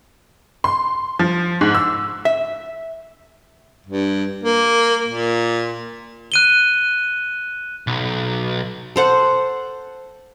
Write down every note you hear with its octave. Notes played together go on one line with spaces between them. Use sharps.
C6
F3
G#2
E6
E5
G2
A#3
A#2
F#6 D#7 G7
B1
A4 C5 F#5